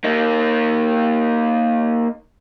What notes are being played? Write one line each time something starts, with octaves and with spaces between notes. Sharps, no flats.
A#3 D#4